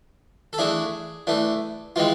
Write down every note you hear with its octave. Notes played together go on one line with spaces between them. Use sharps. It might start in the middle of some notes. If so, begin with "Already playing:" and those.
A4
E3 A3 D4 G#4
E3 A3 D4
E3 G#3 C4 F4